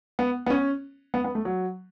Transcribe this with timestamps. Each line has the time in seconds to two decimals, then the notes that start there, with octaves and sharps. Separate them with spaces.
0.19 B3
0.46 B3
0.50 C#4
1.14 B3
1.24 B3
1.35 A3
1.45 F#3